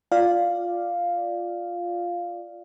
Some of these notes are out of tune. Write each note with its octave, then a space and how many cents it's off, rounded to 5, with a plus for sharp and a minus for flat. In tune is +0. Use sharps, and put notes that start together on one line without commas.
F4 +0 D5 +0 F5 +0